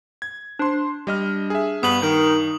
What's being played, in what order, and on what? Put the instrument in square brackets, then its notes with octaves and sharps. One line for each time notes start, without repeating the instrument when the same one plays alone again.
[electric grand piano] G#6
[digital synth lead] D4 [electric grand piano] C5 C6
[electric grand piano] G3 D#5 F6
G#4 E5
[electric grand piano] G2 [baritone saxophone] B3 [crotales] D#6 F#7
[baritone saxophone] D#3 [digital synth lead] D#4